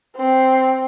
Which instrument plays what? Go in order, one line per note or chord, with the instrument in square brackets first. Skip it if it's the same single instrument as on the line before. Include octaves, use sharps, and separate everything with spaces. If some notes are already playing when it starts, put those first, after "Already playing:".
[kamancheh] C4